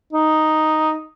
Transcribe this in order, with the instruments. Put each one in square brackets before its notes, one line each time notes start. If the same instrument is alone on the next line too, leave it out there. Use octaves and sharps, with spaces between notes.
[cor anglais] D#4